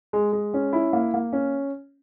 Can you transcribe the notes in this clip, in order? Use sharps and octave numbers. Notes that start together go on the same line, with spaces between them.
G#3
G#3
C#4
E4
A#3
A#3
C#4